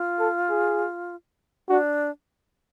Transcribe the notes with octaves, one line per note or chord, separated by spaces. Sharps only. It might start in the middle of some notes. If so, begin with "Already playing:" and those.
Already playing: F4
A4
G#4
D4 F#4